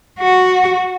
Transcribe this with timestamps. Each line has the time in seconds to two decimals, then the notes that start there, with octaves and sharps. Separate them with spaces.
0.19 F#4